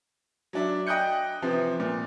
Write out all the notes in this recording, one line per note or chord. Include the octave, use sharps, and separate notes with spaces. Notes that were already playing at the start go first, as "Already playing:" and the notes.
F#3 D4 E5
D#5 G5 D#6 F#6 G6 C#7
C3 E3 F3
A#2